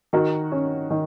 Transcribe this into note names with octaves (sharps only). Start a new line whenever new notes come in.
D#3 F#4 A#4
C#4
D#3